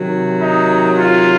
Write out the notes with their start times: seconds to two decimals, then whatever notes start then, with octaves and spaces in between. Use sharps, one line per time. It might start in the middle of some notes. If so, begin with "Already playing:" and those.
Already playing: C3 D#3 F#3
0.40 D#4
0.94 F4